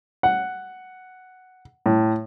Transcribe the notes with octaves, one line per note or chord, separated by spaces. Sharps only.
F#5
A2